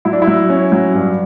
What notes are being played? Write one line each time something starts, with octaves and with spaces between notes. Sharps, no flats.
F#3 E4
D4
E4
F#3
C#4
F#3
G2